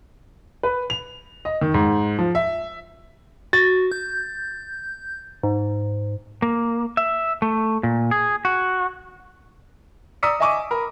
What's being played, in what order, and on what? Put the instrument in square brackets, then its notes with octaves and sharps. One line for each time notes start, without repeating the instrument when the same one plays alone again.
[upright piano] B4
F7
D#5
D#3
G#2
F3
E5
[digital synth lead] F#4 [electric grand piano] A6
[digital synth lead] G6
G#2
[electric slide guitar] A#3
E5
A3
A#2
G#4
F#4
[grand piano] D5 A#5 D#6 E6 B6 C#7
D#5 E5 G#5 C#6 D6 D#7
A#4 B5